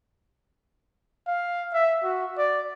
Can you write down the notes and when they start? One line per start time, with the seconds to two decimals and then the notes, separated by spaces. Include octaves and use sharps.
1.27 F5
1.73 E5
2.03 F#4
2.38 D5